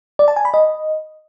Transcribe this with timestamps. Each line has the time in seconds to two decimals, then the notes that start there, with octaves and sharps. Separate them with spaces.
0.19 D5
0.28 A5
0.36 G#5
0.45 B5
0.54 D#5